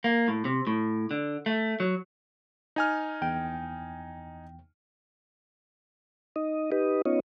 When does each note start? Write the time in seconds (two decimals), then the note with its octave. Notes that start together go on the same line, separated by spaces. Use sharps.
0.04 A#3
0.28 A2
0.45 C3
0.67 A2
1.11 D3
1.46 A3
1.80 F#3
2.76 D#4 G#5 F6
3.22 E2 G5
6.36 D#4 D#5
6.72 D#4 G4 B4 D#5
7.06 B3 C#4 D#4 F4 C#5 D#5